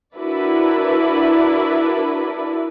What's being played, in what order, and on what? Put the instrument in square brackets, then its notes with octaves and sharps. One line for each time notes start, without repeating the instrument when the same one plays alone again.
[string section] D4 E4 F#4 A#4 B4 D5